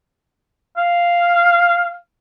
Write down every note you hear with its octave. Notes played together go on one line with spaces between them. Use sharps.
F5